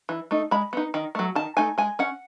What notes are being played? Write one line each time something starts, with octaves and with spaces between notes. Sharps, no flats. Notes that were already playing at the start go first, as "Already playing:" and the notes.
E3
A3 D#4
G#3 B5
B3 D#4
D#3
F#3 A3
D#3 A5
A3 D#4 G#5
G#3 G#5
C#4 F#5